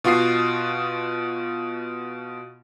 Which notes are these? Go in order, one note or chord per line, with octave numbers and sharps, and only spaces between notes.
B2 F4 F#4 D#6 C7